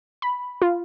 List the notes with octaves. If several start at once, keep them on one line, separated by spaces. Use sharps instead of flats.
B5
F4